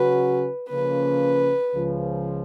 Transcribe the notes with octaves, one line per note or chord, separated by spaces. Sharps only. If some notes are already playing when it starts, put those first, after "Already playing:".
Already playing: C#3 F#3 C#4 F#4 B4
C#3 F3 A#3 C#4 B4
C#2 C#3 F3